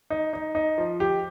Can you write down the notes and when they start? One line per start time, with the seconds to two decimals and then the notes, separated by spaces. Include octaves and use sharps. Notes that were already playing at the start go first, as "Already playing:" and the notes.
0.10 D#4
0.33 D#4
0.55 D#4
0.78 F3
1.00 G4